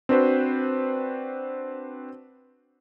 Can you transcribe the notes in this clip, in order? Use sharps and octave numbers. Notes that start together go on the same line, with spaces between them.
C4 D4 F#4 B4 C5